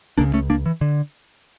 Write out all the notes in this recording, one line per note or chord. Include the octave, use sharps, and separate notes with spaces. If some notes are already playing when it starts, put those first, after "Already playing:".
C#2 C#3 A#3 D4
A3 C#4
A#3 D4
E3
D3